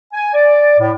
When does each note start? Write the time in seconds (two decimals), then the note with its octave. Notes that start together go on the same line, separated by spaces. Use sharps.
0.13 G#5
0.34 D5
0.79 A2